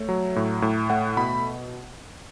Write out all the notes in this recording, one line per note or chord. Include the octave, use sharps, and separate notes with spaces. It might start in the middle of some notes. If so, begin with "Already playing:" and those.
Already playing: A3 C#5
F#3
A2
A2
A3 F#5
B2 B5